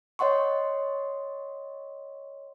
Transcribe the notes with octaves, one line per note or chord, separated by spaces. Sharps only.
C#5 D#5 F#5 C6 C#6